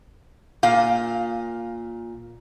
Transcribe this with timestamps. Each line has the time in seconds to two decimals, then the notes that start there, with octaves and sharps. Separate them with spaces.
0.63 A#2 F5